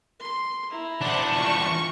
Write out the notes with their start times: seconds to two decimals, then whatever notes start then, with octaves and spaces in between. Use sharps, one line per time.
0.20 C6
0.70 E4 A#5
1.01 E2 D4 C5 F#5
1.34 F4 C#6